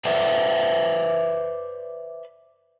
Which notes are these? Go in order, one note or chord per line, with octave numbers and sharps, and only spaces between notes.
B4 C5 D5 E5